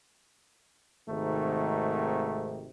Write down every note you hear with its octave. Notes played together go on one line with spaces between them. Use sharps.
G#1 G#2 C3 D#3 A3